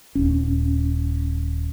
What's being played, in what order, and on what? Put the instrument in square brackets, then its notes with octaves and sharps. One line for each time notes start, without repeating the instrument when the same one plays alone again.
[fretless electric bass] D#1 C#4